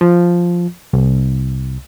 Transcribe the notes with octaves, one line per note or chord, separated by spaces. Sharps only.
F3
C2